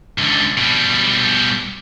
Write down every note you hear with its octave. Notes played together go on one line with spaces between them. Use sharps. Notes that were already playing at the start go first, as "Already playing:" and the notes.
C#2 D3
B2 G3